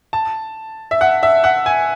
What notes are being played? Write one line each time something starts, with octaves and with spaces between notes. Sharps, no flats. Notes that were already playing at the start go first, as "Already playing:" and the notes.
A5
E5
F#5
E5
F#5
G#5